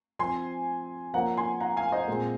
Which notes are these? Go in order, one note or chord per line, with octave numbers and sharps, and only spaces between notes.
F3 C4 G#5 C6
F3 A#3 C#4 F#5 A#5
G#5 C6
F#5 A#5
F5 G#5
C5 D#5
A#2 G#3 C4